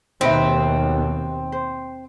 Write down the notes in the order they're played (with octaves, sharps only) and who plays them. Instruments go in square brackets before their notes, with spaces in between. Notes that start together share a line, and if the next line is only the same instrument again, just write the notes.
[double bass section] D#2 B2 [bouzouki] C4 [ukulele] D#4 B4 E5
[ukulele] C5